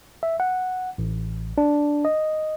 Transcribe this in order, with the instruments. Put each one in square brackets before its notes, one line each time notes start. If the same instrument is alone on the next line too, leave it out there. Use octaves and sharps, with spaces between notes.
[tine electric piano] E5
F#5
A1
D4
D#5